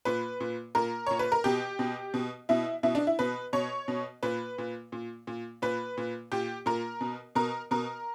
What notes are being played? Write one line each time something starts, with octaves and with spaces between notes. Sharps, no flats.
A#2 B4
A#2
A#2 A#4
A#2 C#5
B4
A#4
B2 G4
B2
B2
B2 E4
B2 E4
D4
E4
B2 B4
B2 C#5
B2
A#2 B4
A#2
A#2
A#2
A#2 B4
A#2
A#2 G4
A#2 A#4
B2
B2 A#4
B2 A#4